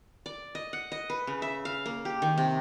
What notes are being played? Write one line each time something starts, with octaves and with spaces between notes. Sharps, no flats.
D5
D#5
F#5
D#5
B4
C#3
E5
F5
A#3
G4
D#3
C3